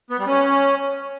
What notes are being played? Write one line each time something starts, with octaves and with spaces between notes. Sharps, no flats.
B3
G3
C#4